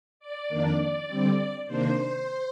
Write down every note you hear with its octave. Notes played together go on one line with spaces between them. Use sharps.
D5
F2 D#3 A#3 D4
D3 G3 C4
C3 D#3 A#3 D4 C5